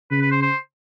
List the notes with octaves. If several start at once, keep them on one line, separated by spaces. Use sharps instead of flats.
C#3 B4
B4
C5
C5